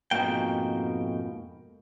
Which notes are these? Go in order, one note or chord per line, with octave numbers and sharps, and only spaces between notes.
F2 G#2 B2 F3 A#3 G5